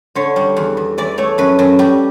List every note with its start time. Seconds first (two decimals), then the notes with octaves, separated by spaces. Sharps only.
0.15 D3 C#5
0.36 G3
0.56 E2
0.77 E2
0.98 E3 D5
1.18 A3 C#5
1.38 F#2 B4
1.59 F#2
1.79 G3 G4